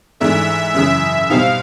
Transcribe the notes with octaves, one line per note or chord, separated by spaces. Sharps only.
G#2 E3 A3 D4 E5
F#2 C#3 E3 E5
B2 G3 C4 D#4 F5